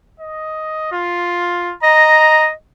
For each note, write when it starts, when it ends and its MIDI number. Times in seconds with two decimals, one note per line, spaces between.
0.20 0.90 75
0.92 1.73 65
1.83 2.52 75
1.83 2.47 82